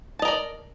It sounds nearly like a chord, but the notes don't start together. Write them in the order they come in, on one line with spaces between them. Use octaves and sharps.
A5 D#5 A#4 D5